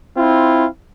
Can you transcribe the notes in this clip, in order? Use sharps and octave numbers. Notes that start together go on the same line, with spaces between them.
C4 E4 F4